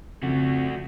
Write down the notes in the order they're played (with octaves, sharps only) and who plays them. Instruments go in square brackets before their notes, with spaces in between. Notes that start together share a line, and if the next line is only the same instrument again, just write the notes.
[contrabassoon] F2 [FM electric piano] C#3 [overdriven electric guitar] A3 F#4